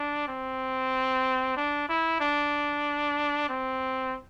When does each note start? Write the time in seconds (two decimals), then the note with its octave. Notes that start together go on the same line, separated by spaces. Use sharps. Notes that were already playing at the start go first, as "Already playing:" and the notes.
Already playing: D4
0.28 C4
1.56 D4
1.89 E4
2.20 D4
3.49 C4